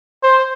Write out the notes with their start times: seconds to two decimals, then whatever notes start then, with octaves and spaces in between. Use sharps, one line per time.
0.23 C5